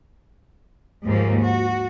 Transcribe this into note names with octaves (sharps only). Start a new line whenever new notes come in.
D#2 G#2 F3 A#3
F#4